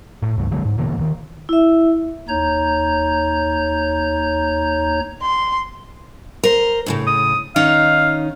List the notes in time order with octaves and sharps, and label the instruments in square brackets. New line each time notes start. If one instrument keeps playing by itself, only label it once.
[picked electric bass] A2
C#2 G2
D3 F#3 G#3 A#3
G#2
B2 D3 E3 A#3
D#1 D#3
[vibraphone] E4 E5
[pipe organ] D#2 D#4 C#5 A#5 G6
[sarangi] C6
[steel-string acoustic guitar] A#4 C5
D2 A2 C#3
[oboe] D#6
[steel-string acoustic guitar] D#3 C#4 D#4 [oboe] F5